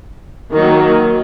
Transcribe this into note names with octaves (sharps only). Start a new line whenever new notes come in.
D#3 F#3 A#3